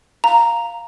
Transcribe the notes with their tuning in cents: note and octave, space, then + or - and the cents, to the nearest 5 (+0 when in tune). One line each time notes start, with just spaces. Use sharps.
F5 +0 A#5 +0